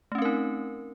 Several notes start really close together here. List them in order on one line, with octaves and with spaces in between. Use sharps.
A3 C#4 C4 A#4 D#4